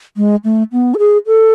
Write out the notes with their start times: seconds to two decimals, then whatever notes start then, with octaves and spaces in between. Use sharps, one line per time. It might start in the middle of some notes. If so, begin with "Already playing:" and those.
0.17 G#3
0.44 A3
0.72 B3
0.94 A4
0.99 G#4
1.27 A4